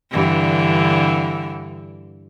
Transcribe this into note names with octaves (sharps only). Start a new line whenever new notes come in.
G2 D3 E3